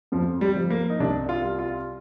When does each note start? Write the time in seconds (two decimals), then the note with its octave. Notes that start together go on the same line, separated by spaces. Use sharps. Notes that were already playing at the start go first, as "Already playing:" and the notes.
0.12 F2 F3
0.41 G3
0.55 F3
0.71 A#3
0.90 D#4
1.00 C2 D4
1.29 F4
1.43 G3
1.59 F4